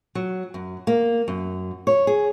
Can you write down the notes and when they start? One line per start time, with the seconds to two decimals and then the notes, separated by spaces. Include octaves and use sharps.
0.15 F#3
0.54 F#2
0.87 A#3
1.28 F#2
1.87 C#5
2.07 G#4